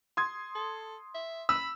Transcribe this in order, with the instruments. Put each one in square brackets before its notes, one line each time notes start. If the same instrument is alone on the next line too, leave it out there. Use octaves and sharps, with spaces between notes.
[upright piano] C6 D#6 G#6
[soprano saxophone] A4
E5
[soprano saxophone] B5 [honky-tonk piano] E6